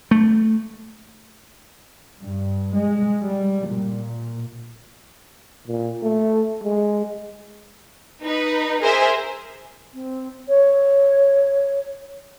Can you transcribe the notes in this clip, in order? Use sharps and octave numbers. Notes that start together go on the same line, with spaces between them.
A3
G2
G#3
G3
A#2
A#2
A3
G#3
D#4 B4
G#4 A#4 C5 E5
C4
C#5